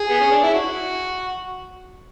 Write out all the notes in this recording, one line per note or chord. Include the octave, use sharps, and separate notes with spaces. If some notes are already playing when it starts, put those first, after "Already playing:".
Already playing: G#4
B3
C#4
D4
E4
F#4